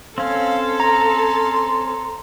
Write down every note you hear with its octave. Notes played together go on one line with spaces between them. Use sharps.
C4 C#4 A4 F5
A#5 C6